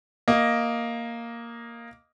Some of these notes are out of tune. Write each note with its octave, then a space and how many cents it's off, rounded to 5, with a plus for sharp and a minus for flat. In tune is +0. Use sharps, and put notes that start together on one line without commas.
A#3 +0 D#5 +0